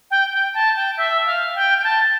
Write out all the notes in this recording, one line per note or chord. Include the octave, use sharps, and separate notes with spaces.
G5
G5
A5
G5
E5
F5
G5
G5
A5